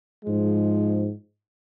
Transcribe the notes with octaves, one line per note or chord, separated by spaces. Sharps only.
G#2 F3 G#3